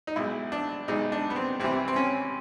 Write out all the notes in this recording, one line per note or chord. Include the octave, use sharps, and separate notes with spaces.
D#4
B1 B2 G#3 E4
D4
B1 B2 G#3 D#4
D4
B3
C4
C2 C3 E3 C4
C4
C#4